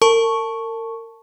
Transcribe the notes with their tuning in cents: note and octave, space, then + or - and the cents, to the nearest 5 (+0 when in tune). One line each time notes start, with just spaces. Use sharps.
A#4 -35 A5 +0 C#6 +0